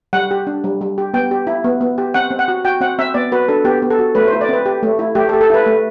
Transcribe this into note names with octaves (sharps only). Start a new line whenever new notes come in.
G3 F#5
G4
D4
G3
G3
G4
B3 G5
G4
E4
B3
B3
G4
C4 F#5
C4
F#5
F#4
F#4 G5
C4 F#5
C4 E5
B3 D5
F#4 B4
D4 A4
B3 G4
B3
A4
F#4
A3 B4
E4 C5
D5
C4 B4
G4
A3
E4
A3 G4
A4
G4
A4
E4 B4
A3